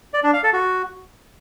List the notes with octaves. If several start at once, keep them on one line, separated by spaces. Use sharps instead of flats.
D5
D4
F5
A4
F#4